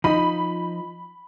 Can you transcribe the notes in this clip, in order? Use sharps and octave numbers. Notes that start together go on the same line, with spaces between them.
F3 D#4 B5